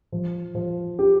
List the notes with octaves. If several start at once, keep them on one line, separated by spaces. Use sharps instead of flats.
F3
F3
G4